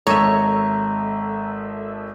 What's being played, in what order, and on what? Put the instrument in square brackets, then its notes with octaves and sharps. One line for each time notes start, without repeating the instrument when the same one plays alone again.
[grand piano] G#1 [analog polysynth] A4 D#5 E5 [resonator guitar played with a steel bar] C#5 [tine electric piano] A#5